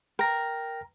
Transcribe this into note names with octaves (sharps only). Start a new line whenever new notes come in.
A#4 G5 A#6